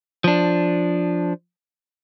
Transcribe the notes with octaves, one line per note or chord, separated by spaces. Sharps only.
F3 D4